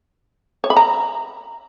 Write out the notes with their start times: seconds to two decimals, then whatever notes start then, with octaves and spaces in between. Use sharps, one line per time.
0.64 C#5
0.70 B5
0.77 A#5